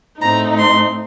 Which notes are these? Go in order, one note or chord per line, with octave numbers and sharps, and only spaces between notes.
A2 A3 C4 D#4 A#5
C6